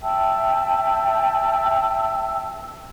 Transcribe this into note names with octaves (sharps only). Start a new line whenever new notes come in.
E5 G5 A5 E6